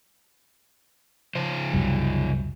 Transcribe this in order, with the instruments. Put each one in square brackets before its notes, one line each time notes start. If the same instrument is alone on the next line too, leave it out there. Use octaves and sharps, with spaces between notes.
[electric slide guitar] C#3 F3 C5
[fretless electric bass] C2 F#2 G3